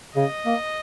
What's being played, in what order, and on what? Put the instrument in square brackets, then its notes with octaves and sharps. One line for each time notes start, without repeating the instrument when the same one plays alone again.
[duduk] C#3 [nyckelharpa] D#5
[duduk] A#3